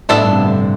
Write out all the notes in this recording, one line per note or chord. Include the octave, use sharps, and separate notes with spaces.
A2 B3 D4 A4 E5
G2
C3
D3